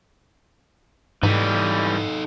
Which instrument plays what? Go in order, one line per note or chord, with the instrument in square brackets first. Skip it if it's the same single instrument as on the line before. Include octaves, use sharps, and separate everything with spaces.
[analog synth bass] G#2 [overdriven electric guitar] E3 G3 [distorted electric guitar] D#4 A4